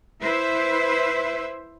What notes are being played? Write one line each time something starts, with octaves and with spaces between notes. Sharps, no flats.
E4 B4 C5 E5